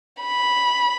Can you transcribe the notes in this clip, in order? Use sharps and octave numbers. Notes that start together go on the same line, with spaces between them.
B5